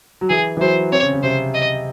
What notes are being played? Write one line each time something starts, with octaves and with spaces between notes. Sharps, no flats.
F#3
E3 G#4
E3
F#3 C5
C4 C#5
C#3
C#3
C3 C5
D#5